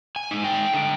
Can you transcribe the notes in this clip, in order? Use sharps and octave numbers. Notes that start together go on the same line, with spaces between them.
G#5
G#3 D#4
G5
D3